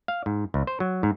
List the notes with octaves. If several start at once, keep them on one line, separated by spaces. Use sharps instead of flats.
F5
G#2
C#2
C5
F#3
G#2